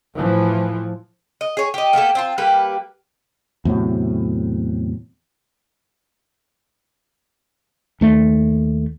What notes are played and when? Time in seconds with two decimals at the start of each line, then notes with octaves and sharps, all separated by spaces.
0.15 A2 E3 F3
1.41 D#5
1.57 G#4 C#5
1.74 G4 D#5
1.93 A#3 B3 G4 A4
2.15 C4 F4 A5
2.38 G3 A#3 G4 B4
3.65 E2 A2 C3 F#3
8.01 D#2 A3